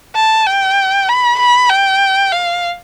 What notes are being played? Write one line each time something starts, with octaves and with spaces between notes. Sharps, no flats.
A5
G5
B5
B5
G5
F5